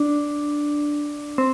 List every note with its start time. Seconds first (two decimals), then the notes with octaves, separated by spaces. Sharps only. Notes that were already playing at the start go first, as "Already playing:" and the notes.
Already playing: D4
1.38 C4